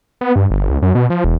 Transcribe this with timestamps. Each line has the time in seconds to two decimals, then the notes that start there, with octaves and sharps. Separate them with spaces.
0.21 B3
0.36 G2
0.51 G1
0.70 C#2
0.82 F#2
0.95 B2
1.10 F3
1.24 E1